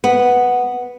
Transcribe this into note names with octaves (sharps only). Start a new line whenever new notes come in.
B3